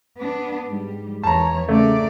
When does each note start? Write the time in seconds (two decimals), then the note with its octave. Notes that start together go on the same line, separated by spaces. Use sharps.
0.17 B3 D4
0.69 G#2 G3
1.23 E2 C#5 A5 A#5
1.69 C#3 A3 A#3 D5